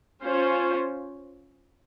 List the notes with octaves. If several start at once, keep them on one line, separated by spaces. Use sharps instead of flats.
C#4 F4 C5